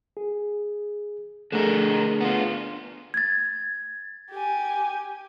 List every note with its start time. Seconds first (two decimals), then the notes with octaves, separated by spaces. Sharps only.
0.17 G#4
1.52 D3 A3 D4 G#4 A#4
2.20 B3 F4
3.14 G#6 A6
4.31 G4 G#5